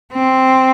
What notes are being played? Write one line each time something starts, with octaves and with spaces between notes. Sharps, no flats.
C4